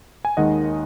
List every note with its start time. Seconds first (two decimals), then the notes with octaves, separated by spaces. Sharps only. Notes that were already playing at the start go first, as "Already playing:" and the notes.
0.25 G#5
0.37 D#2 D#3 G#3 D#5 F#5